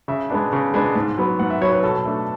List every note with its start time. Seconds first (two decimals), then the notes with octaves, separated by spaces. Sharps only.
0.08 C#3 E5
0.30 G#3 B3 D4
0.53 C#3
0.74 G#3 B3 D4
0.95 G#2
1.18 F#3 B3
1.39 G#2 F#5
1.50 E5
1.61 F#3 B3 C#5
1.73 B4
1.83 B2 A4
2.06 A3 D4